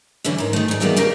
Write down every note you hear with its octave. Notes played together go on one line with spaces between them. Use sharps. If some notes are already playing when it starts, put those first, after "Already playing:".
F#2 D3 E3 C#4
G#2 A#4
D#3 A3
G#2 G3
D#3 E3 G3 G#3 A#3 B3
C#3 A#3 G4 A#4